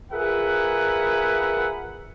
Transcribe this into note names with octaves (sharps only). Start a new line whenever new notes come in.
F4 G#4 A#4 B4 E5 F#5